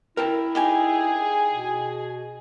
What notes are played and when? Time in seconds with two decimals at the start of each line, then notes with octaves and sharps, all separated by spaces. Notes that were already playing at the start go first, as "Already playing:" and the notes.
0.17 E4 A#4 G5 A5
0.55 D#4 G4 G#4 G#5
1.50 B2